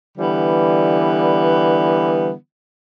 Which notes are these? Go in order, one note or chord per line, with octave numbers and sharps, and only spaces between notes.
D3 E3 G3 B3